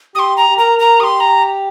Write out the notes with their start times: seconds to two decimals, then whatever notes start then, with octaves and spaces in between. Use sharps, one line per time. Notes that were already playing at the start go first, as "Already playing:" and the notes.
0.15 G4 C6 D#6
0.37 A#5
0.50 G4
0.58 A#4 A#5
0.79 A#5
1.00 G4 D#6
1.04 C6
1.20 A#5